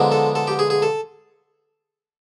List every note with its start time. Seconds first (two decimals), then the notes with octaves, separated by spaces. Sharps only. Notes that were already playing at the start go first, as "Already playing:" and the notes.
Already playing: D3 F3 G#3 B3 D#4
0.12 A4
0.35 A4
0.47 G4
0.59 G#4
0.70 G#4
0.82 A4